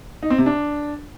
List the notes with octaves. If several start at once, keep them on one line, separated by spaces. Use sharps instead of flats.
D#4
C4
C3
D4